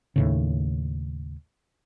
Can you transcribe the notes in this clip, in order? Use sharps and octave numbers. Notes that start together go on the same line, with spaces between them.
D#2 A2 C#3